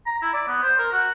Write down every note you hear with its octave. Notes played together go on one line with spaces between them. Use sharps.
A#5
E4
D5
B3
C5
A#4
F#4